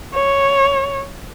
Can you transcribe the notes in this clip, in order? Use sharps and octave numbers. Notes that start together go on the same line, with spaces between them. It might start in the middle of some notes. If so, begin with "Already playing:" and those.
C#5